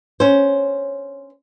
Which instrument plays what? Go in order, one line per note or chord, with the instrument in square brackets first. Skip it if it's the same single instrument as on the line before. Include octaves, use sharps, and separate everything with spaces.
[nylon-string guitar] C#4 C5